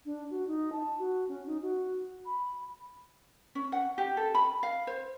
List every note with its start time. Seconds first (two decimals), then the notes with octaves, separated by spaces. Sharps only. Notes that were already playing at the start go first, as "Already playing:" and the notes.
0.05 D4
0.30 F#4
0.47 D#4
0.72 A5
0.99 F#4
1.29 C#4
1.46 D#4
1.62 F#4
2.26 B5
3.55 C#4
3.72 F#5
3.98 G4
4.17 A4
4.35 B5
4.63 F5
4.87 C5